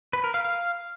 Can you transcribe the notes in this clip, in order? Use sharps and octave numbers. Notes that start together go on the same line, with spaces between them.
B4
A#4
F5
F5